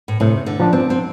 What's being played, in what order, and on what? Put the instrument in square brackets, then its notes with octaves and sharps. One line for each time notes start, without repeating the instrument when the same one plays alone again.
[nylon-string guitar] A2
[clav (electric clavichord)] A2 [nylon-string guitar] C3
[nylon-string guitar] D3
[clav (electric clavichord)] F3 D4
[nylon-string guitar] C4
C4